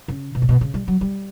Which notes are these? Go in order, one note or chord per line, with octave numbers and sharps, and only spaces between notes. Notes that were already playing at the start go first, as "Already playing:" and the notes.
C#3
B2
A2
B2
C#3
G3
F#3
G3